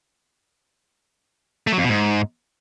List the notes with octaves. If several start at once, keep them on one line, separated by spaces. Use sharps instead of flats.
A3
F#3
F2
B2
G#2